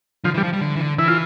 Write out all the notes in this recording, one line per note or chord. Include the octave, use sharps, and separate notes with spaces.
D3 F3
E3
G3
F3
G3
D3
E3
D3
E3 E4
F4